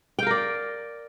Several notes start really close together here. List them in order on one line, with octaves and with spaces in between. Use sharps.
G5 F5 A#4 D5